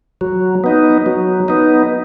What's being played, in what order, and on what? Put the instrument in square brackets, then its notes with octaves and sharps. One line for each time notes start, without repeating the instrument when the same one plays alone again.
[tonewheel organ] F#3
B3 D#4
F#3
B3 D#4